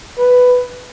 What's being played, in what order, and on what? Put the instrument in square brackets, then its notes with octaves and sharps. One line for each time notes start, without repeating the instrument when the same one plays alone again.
[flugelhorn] B4